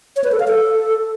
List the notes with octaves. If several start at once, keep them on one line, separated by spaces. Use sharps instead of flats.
C#5
B4
A4
F5
A4